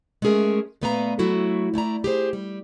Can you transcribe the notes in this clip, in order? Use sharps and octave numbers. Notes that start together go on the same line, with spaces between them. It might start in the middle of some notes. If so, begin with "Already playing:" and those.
G#3 A3 C#4 G#4 A#4 E5
A#2 A3 B3 B4 F5 A#5
F#3 A3 E4 F#4
A3 E4 D5 A#5
G4 G#4 C5
G3